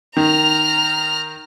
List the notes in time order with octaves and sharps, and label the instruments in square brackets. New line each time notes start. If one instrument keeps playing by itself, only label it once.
[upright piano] D#3 [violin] A#5 F6